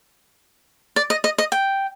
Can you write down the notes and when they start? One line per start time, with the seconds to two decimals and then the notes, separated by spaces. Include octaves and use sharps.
0.96 D5
1.10 D#5
1.24 D#5
1.38 D#5
1.52 G5